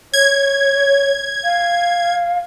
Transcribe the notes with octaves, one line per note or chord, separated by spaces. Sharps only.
C#5 G#6
F5